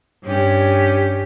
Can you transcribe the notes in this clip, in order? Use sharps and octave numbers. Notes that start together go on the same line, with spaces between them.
G2 C#4 G4